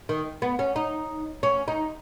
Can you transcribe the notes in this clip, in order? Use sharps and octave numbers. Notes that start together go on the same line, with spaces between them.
D#3
B3
C#4
D#4
C#4
D#4